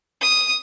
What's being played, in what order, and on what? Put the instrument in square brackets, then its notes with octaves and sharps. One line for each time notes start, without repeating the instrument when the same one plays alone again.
[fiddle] D#6